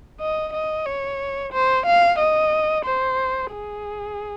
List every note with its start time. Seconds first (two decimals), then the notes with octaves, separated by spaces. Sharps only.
0.20 D#5
0.53 D#5
0.86 C#5
1.53 C5
1.86 F5
2.19 D#5
2.85 C5
3.51 G#4